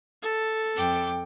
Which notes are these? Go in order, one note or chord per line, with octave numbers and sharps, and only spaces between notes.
A4
F2 G5 D6